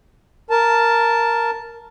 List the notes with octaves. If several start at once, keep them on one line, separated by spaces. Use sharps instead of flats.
A#4 A5